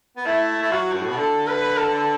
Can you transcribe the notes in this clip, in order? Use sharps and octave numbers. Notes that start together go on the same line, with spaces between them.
B3
A3 E4
A3
F#3 F#4
F#2
A2
B2
D3 A4
B4
A4